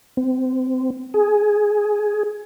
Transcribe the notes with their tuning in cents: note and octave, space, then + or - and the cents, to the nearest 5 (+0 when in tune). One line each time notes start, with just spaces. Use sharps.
C4 -25
G#4 +10